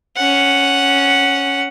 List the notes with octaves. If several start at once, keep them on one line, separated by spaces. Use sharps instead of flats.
C#4 F#5